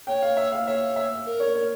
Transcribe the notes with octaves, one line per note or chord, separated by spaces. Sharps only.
C#5 G5
F5
E5
F5
C#5 E5
E5
A#4
C#5
C#5